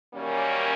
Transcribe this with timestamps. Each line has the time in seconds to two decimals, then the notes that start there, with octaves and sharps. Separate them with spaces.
0.13 F#2 D#3 G3 A#3 C#4